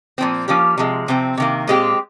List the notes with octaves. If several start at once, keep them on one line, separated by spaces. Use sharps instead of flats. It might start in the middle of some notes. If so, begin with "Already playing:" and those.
A#2 F3 C4
F3 A#3 C#4 G4
C3 F3 G#3
C3 F3 C4
C3 D#3 A#3
A#2 G#3 C4 G4